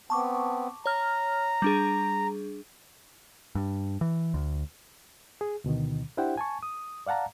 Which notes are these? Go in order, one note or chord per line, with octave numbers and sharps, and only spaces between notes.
B3 C4 A5 C#6 D6
C#5 A#5 F6
G3 D4 G#4
G2
E3
D2
G#4
D2 B2 D3 D#3
D4 E4 G4 C5 F#5 G5
G#5 A5 C#6
D#6
D5 F5 F#5 A5 A#5